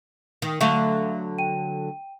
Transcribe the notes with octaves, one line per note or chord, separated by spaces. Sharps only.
D#3
D3 F#3 A3 E5 F5 C#6
G5 D#7